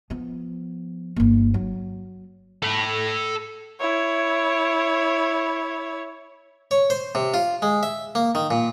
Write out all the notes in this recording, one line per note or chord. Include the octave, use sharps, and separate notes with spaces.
F3 B3
G1 A#3
F#3
A4 B5
E4 C#5
C#5
C5
C3
F4
G#3
E5
A#3
D#3
A#2